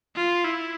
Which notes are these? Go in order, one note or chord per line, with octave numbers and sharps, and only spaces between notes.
F4
E4